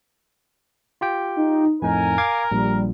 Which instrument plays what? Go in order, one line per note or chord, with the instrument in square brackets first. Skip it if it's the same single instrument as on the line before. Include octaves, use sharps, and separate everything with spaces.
[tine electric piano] F4 G4 G5
[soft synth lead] D#4
[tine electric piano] F2 A2 D#4 [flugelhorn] A#4 [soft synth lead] G#5
[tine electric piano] F5 D6 G#6
[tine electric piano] A#1 A#2 [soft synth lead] G3